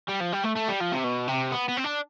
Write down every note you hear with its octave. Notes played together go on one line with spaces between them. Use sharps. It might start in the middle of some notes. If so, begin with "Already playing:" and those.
G3
F3
G3
A3
A3
G3
F3
C3
B2
C3
B3
B3
C4
D4